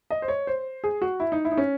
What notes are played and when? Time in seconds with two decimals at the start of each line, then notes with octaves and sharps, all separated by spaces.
0.11 D#5
0.22 C5
0.28 C#5
0.47 C5
0.84 G#4
1.02 F#4
1.20 E4
1.32 D#4
1.45 E4
1.52 D#4
1.58 C#4